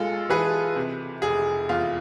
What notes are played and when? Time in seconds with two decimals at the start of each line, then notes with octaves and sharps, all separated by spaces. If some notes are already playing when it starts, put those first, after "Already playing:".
Already playing: B1 G#3 F4 A4
0.29 E3 G#4 B4
0.76 C3
1.22 F1 G#4
1.69 E2 F4